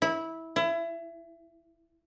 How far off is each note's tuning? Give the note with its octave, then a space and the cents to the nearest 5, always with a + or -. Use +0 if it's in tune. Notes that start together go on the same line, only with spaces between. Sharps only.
E4 -15
E4 +25